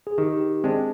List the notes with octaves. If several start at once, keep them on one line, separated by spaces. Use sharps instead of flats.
G#4
D#3 G4
G4
G#3 C4 D4